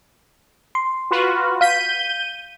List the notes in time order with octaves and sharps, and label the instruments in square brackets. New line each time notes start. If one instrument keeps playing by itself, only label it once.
[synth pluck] C6
[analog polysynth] F4 F#4 B4
[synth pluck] F5 B6 [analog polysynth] G6 D#7